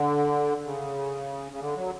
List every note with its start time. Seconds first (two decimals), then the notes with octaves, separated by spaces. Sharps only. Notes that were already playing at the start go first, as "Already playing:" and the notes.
Already playing: D3
0.65 C#3
1.52 C#3
1.60 D3
1.76 F#3